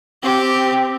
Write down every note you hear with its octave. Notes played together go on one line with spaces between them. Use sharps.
C4 G4